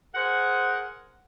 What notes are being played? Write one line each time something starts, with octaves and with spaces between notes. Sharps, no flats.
G#4 A#4 C5 F#5